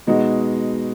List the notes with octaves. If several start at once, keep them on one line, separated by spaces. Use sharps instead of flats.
B2 G#3 B3 D#4 F#4